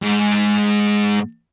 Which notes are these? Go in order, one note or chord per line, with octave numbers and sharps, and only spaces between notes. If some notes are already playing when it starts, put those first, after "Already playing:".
G#2